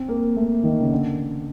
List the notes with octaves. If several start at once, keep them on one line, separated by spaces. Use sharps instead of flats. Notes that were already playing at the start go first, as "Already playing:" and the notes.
Already playing: C4
A#3
A3
D#3
C#3
D3